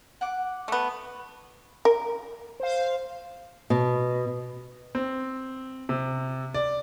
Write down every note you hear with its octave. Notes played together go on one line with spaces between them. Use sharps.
F#5 D6
A3 B3
A#4
C5 F5
B2
C4
C3
D5